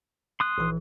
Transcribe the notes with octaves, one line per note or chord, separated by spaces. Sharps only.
C6 D#6 F#6
A#1 E3